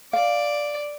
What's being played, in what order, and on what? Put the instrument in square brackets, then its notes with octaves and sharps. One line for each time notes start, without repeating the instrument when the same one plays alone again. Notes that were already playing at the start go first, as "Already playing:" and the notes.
[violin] D5 [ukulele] F5